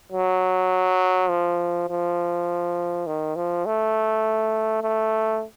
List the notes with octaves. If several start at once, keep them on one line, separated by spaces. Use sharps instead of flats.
F#3
F3
F3
D#3
F3
A3
A3